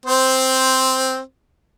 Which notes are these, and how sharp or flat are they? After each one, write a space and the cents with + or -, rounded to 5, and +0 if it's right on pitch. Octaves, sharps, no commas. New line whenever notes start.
C4 +0 C5 +0